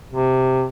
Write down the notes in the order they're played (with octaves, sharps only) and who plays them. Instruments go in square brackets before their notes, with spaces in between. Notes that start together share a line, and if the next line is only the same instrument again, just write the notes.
[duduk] C3